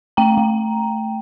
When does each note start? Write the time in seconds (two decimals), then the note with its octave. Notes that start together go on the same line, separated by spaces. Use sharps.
0.17 A3 G5 A#5
0.38 A3